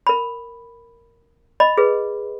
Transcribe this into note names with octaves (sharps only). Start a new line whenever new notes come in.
A#4 B5
D#5 B5
G#4 B4